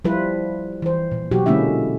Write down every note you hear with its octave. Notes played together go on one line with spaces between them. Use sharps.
F3 G3 E4 F4 B4
E3 C5
A#2
B2 F#3 F#4 G4
D3 G#3 A#3 C#4 E4 E5